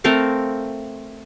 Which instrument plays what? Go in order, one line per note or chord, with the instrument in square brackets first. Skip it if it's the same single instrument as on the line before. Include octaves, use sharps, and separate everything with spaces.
[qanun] A3 C4 A#4 F5